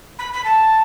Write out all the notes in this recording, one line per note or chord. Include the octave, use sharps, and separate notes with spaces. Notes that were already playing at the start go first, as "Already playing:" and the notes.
B5
B5
A5